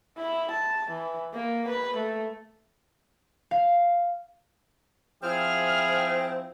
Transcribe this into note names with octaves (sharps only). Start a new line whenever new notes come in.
E4
A5
E3
A#3
B4
A3
F5
F3 C4 E4 G#4 F6